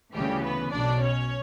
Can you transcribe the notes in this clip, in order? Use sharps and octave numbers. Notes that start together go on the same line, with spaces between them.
D2 C#3 E3 G3 G4
B3 B4
B1 B2 D4 D5
C#4 C#5